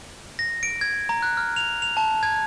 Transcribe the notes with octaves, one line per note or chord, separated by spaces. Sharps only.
A#6
D7
G#6
A#5
F#6
F6
F7
F7
A5
G#6